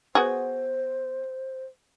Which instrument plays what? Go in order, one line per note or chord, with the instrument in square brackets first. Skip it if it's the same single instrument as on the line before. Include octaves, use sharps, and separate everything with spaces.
[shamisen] B3 F#4 G#4 [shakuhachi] C5